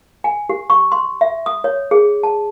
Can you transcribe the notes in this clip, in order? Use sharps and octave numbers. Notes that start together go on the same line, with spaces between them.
G#5
G4
C#6
C6
E5
D#6
C#5
G#4
A5